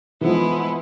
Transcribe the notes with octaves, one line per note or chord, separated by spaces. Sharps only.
E3 F3 G#3 B3 E4